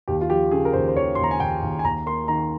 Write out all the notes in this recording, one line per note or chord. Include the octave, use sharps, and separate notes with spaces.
D#2 G4
F4
F3 G4
C#3 G#4
A#4
D#2 C5
C5
D#2 C#5
D#2 C6
A#5
G#5
D#2 G5
D#2
G#5
D#2 A#5
A#3 C6
D#3 A#5